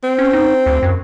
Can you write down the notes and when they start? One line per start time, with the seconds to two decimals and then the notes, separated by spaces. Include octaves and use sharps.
0.04 C4
0.18 C#4
0.33 D#4
0.66 D2
0.82 F#2